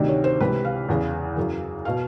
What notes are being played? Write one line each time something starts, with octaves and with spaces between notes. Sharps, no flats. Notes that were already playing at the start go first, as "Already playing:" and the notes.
Already playing: D2 C3 D#3 D5
C#5
C5
C#2 C3 E3 B4
F5
E2 C#3 E3
F#2 C#3 E3
B2 F5